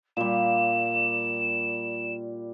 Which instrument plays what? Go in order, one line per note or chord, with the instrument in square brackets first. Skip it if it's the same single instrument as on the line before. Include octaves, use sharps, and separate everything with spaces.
[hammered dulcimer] A#2 G3 [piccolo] E7